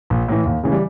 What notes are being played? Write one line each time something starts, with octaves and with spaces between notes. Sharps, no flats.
A#1
A2 E3
D#2
C#3 E3
G3